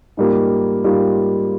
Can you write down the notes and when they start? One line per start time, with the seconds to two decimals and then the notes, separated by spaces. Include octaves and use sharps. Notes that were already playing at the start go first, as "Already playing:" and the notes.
0.17 G#2 G3 A#3 F4
0.84 G#2 G3 A#3 F4